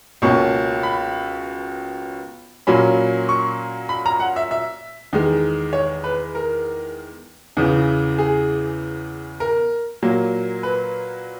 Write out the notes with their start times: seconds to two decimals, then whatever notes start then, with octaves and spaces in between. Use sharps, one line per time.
0.22 C#2 B2 A#3 C#4 C#6
0.83 B5
2.67 A#2 F#3 A#3 C#4 B5
3.29 C#6
3.89 B5
4.06 A#5
4.20 F#5
4.36 E5
4.51 E5
5.13 E2 D#3 G#3
5.73 C#5
6.04 B4
6.35 A#4
7.57 E2 C#3 E3
8.18 G#4
9.40 A#4
10.02 A#2 F#3 A#3
10.63 B4